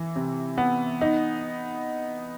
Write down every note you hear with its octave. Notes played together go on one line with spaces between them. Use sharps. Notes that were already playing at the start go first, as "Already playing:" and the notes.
Already playing: E3
C3
B3
D#4